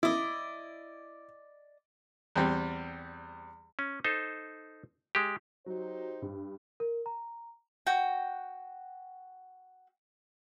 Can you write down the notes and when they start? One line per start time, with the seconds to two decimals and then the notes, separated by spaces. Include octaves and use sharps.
0.03 E4 D5 D#5
2.36 E2 G3 C4
3.79 C#4
4.04 D#4 A4 C5
5.15 G#3 G4
5.66 F#3 D#4 G4 C5
6.22 G2
6.80 A#4
7.06 A#5
7.87 F#4 G5